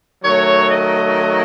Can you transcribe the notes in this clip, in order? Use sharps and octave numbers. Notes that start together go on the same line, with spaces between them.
D#3 F#3 A3 C#5
D#5